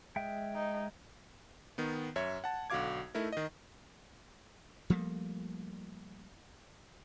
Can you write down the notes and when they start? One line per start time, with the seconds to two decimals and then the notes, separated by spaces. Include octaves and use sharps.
0.16 G#3 E5 G5
0.55 D#4
1.78 D#3 B3
2.16 F#2 C#5 E5 G#6
2.44 F#5 A5
2.70 B1 D3 F#4 F5 D6 G#6
3.14 A3 D#4 E4 A#4
3.32 D#3 D#5
4.90 F3 G3 A3 A#3